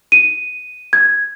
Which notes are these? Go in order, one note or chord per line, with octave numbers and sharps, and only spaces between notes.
D#7
G#6